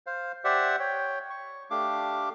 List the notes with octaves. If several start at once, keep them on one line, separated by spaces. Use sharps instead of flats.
C5 F5
G4 C5 D5 E5 F#5
C#5 G5
C#6
A3 D4 G4 F5 D6